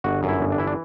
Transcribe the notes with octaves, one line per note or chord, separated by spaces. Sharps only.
G1 F#4
F#2
E4
G1
D4
E3 E4
D4